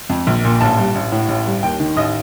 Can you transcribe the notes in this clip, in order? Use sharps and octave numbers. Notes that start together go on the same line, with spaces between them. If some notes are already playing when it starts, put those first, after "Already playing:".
F2
A#1
A#2
A1 A5
G2
A1
A2
A1
G2
D#2 G5
D#3
A1 D#5